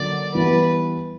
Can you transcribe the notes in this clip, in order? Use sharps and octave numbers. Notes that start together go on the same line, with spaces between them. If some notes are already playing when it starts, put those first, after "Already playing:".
Already playing: D3 F#3 A#3 D#4 D5
E3 G3 B3 E4 B4